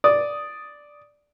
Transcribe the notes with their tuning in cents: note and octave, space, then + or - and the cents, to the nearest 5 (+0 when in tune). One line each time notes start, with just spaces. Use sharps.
D5 +0 D#6 +0